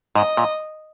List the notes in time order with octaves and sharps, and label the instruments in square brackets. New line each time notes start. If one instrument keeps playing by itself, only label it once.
[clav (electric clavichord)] G#2 [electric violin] D#5
[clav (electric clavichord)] A#2